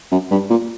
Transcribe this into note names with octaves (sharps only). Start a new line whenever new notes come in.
F#2
G2
A#2